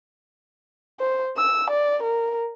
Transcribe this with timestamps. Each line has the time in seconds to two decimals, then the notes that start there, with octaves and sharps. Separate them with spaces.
0.99 C5
1.37 E6
1.70 D5
2.02 A#4